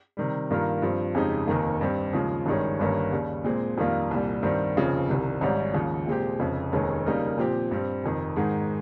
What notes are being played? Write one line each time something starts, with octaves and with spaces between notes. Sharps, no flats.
C3 D#3 G3
G2 D#3 A#3 F4 A#4
G2 F3 C4
F2 C#3 G#3 D#4 G4
F1 D#2 D#3 A#3
G2 G3 C4 G4
D#2 C#3 F3 G#3
G#1 G2 D#3 G#3 C#4
G1 G2 D#3 A#3 C#4
D#2 C#3 G3
A#2 G#3 C4
F2 D#3 G3 A#3 F4
C2 A#2 G3
G2 D#3 G3 C4
F1 D#2 C#3 F3 C4
C2 C3 D#3 G3
G#1 G#2 G3 C#4
D#2 C#3 F3
A#2 G#3 C4 G4
F1 F2 C#3
F1 D#2 D#3 G#3 C#4
C#3 G3 A#3 D#4 A#4
A#2 F3 C4 G4
G2 G3 C4
F1 F2 D#3
G#2 D#3 G#3 D#4